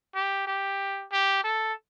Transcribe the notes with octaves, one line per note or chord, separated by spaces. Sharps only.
G4
G4
G4
A4